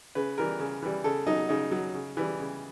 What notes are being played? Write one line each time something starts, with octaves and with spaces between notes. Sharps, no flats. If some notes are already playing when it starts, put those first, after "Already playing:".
C#3 B4
E3 G3 A#4
C#3
E3 G3
C#3 A4
F#3 D#4
C#3 D#4
F#3
C#3
E3 G3
C#3